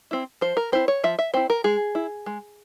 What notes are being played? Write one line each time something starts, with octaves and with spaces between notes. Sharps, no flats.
C4 E4
F3 C5
A#4
C4 E4 C5
C#5
F3 E5
E5
C4 E4 C5
A#4
G#3 G#4
E4
G#3